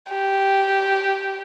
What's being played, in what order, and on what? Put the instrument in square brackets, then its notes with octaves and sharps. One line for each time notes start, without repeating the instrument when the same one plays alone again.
[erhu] G4